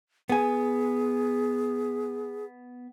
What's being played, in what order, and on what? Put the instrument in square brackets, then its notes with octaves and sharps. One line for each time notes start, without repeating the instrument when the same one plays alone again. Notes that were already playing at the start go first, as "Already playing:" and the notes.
[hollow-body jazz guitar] B3 G#5 [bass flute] G#4